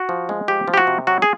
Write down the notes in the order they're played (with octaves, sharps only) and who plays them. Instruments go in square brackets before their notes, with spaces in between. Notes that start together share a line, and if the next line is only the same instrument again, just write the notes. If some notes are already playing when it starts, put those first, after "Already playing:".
Already playing: [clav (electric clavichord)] F#4
F3
G#3
F3 G4
F3
G4
F#4
C3
F#3 F#4
G#4